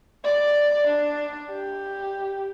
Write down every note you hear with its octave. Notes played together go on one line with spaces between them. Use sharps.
D5
D4
G4